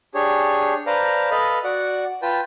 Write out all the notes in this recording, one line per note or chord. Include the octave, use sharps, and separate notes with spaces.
D4 G4 G#4 C#5
B4 C5 D5 F5 A5 A#5
A4 B4 D#5 F5 B5
F#4 D5 F#5
F4 B4 G5 A5